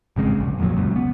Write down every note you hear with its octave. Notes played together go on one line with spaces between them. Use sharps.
G#1 C#3 G#3 C4
F1 B1
F2 A#2 D3 F#3
F#1 C#2 F#2
B3